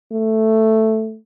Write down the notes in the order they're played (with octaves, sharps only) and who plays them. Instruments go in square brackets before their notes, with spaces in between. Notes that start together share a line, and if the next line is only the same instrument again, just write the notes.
[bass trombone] A3